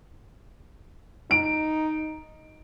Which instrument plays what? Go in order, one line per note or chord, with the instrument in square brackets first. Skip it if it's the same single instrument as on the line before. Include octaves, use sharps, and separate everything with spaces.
[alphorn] D#4 [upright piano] D7